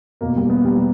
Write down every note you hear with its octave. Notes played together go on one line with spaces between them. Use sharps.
E2 B2 A#3
G3
B3
G3